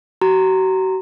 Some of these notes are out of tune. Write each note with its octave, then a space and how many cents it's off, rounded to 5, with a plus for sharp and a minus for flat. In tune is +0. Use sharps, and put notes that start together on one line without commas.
F#4 +40 A#5 -10